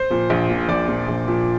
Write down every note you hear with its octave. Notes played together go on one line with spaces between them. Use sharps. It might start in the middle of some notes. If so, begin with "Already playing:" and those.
Already playing: C5
A#2 F3
A#1
A#2 F3
A#1 D5
A#2 F3
A#1
A#2 F3